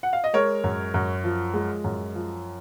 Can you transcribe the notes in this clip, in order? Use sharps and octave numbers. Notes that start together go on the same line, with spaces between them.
F#5
F5
D#5
G#3 A#4 C#5
F#2
F#2
F3
G#3
F#2
F3